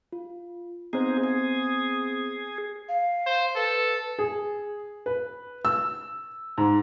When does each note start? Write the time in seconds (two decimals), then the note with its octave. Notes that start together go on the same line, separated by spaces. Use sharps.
0.13 F4
0.93 B3 C4 D#4 G#4 C5
1.23 G#4
2.89 F5
3.26 C5
3.56 A4 B4
4.19 G#4
5.06 B4
5.65 E6
6.58 G#2